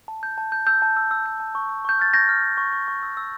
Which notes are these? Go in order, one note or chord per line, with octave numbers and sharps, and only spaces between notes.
A5
G6
A5
G6
E6 G6
A5
E6
E6
G6
A5
C#6
E6
C#6 G6
F6 A6
C#6 G6 A#6
F6
F6
C#6
C#6
C#6
E6
E6